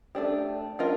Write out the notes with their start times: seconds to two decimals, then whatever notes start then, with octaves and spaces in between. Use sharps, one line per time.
0.15 A3 D4 G4
0.79 D4 F4 A#4 D#5